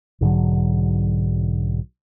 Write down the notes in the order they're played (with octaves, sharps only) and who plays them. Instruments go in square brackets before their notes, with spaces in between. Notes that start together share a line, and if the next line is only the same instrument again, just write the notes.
[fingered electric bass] B1 G#2 D3 F#3